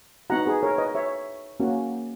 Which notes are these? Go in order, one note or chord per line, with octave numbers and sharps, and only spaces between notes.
B3 D#4 F#4 F#5 A#5
G#4 B4
A#4 C#5
B4 D#5
C#5 E5
A#3 C#4 F#4